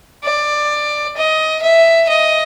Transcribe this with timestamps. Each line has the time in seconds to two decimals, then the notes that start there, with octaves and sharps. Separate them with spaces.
0.24 D5
1.17 D#5
1.62 E5
2.09 D#5